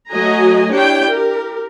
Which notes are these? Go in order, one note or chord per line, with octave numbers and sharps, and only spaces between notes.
F#3 A3 F#4 D#5 G#5 A#5
D4 E4 G4 C#5 G5
G4 A#4